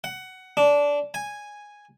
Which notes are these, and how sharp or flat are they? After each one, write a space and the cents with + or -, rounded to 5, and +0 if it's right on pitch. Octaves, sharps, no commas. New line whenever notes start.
F#5 +15
D4 -20
G#5 -5